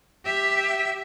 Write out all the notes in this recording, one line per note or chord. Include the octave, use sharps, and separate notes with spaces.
G4 E5